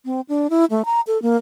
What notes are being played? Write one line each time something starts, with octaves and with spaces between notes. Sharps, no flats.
C4
D4
E4
A3
A#5
A4
A#3